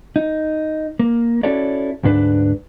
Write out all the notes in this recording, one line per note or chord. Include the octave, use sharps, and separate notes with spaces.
D#4
A#3
C#4 E4 F#4 A4 C#5 D5
D2 G#2 D4 B4